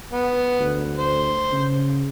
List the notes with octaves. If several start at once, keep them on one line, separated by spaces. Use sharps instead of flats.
B3
D2
C5
C#3